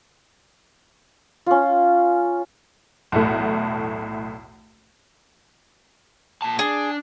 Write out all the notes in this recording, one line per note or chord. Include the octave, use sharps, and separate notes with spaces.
C#4 F4
B1 E2 A2 A3
A#2 A5
D4 G#4